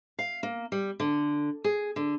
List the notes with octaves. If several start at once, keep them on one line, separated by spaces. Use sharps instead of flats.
F5
A#3
G3
D3
G#4
D3